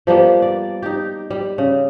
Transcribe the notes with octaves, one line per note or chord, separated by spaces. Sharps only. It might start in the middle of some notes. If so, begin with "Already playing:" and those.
F3 G3 A#3 B3
D5
D#4 G4
G3
C#3